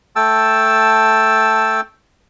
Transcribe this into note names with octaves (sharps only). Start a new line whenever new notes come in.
A3 G5 A5 E6